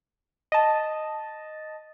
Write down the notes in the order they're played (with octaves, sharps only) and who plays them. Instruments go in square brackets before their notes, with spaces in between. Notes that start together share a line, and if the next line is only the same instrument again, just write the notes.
[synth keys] D#5 A5